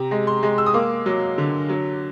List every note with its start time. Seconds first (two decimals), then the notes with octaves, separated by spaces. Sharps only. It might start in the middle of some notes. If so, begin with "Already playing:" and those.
Already playing: C3 A#5
0.11 G#3
0.27 C6
0.43 G#3
0.58 E6
0.66 D#6
0.74 A#3 D6
1.06 F#3
1.38 D3
1.69 F#3